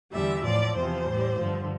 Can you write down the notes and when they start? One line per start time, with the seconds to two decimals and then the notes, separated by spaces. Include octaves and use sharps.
0.12 E2 D3 G3 E5
0.44 A2 F3 D5
0.75 E2 C3 F3 C5
1.07 A2 G3
1.38 G2 D3 F3